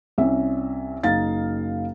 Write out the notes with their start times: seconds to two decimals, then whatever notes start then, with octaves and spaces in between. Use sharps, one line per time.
0.18 C2 C#4 E5
1.03 F#1 D#4 F5 A6